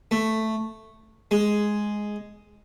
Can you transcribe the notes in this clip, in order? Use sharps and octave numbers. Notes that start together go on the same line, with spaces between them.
A3
G#3